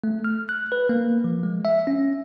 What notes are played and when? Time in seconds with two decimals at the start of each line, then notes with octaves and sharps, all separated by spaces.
0.04 A3
0.25 F6
0.49 F#6
0.72 B4
0.89 A#3
1.24 F3
1.43 G#3
1.65 E5
1.87 C#4